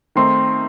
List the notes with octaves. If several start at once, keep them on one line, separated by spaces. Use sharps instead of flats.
D#3 A3 C4 D#4 C6